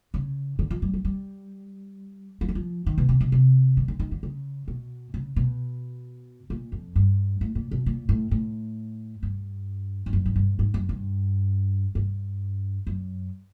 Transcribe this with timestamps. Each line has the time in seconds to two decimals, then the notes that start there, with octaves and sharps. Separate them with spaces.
0.14 C#3
0.59 D3
0.71 F3
0.82 G3
0.94 F#3
1.05 G3
2.41 F3
2.48 E3
2.55 F3
2.86 D#3
2.98 B2
3.09 C3
3.21 C3
3.32 C3
3.77 D3
3.88 D3
4.00 D#3
4.11 D3
4.23 C#3
4.68 B2
5.14 C#3
5.36 B2
6.50 A#2
6.72 F2
6.96 G2
7.41 A2
7.55 A#2
7.71 B2
7.86 A#2
8.09 A2
8.31 A2
9.23 G2
10.06 G2
10.13 F#2
10.26 G#2
10.36 G2
10.59 G#2
10.74 F#2
10.89 G2
11.95 G2
12.87 F#2